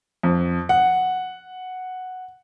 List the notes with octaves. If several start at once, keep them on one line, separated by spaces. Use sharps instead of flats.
F2
F#5